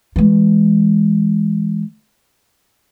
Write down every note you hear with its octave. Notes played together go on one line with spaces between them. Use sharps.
E3 G#3